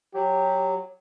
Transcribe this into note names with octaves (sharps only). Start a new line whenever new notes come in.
F#3 G4